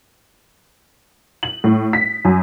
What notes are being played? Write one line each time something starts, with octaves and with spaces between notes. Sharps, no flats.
F#7
A2
B6
F#2